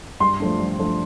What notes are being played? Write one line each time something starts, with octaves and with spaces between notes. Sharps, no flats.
G2 C6
F3 A3 D4
G2
F3 A3 D4